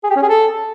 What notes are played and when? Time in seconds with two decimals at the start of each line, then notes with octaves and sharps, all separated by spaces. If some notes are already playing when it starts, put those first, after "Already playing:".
0.03 G#4
0.10 G4
0.16 C#4
0.22 G#4
0.29 A4